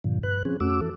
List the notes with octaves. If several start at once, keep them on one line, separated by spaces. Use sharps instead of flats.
G2 A#2 D3 F3
G2 B4 F#6
F3 C4 C#4 G#4
F2 A3 C#4 F#4 D6 E6
E3 A4